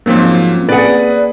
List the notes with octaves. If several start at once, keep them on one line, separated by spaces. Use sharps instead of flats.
G#2 F3 F#3 A#3 C4 C#4
G#4 B4 D5 F#5